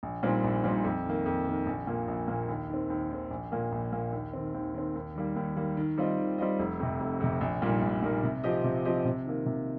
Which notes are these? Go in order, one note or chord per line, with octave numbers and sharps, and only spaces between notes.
A#1
A#2 G3 C4 D#4
A#1
A#2 G3 C4 D#4
F2
D#3 A#3
F2
D#3 A#3
A#1
A#2 A#3
A#1
A#2 A#3
D#2
D#3 C4
D#2
D#3 C4
A#1
A#2 A#3
A#1
A#2 A#3
D#2
D#3 C4
D#2
D#3 C4
D#2
D#3 G3 A#3
D#2
D#3 G3 A#3
D#3
G3 C4 F4 D#5
D#3
G3 C4 F4 D#5
F1
F2 C3
F1
F2 C3
A#1
A#2 G3 D#4 A#4
A#1
A#2 G3 D#4 A#4
C3
F3 C4 G4 D#5
C3
F3 C4 G4 D#5
C3
D#3 A#3
C3